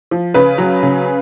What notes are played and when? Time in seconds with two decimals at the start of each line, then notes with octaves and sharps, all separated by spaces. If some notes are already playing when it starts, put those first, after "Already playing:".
0.11 F3
0.34 C#3 B4
0.58 F#3
0.83 C#3